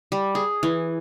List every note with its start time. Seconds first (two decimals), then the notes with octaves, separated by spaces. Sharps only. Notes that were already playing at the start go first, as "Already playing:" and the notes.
0.12 G3
0.35 G#4
0.63 E3